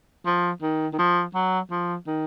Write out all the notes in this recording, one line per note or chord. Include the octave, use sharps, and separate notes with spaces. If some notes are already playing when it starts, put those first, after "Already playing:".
F3
D#3
D#3
F3
F#3
F3
D#3